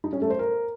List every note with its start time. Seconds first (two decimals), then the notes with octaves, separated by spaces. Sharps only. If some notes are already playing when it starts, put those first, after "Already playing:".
0.04 D#4
0.13 C#4
0.22 A3
0.30 C5
0.39 A#4